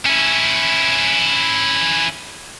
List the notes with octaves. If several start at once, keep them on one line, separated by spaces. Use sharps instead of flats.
C#4 E4